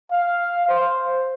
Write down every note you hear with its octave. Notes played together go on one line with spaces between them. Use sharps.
F5
C5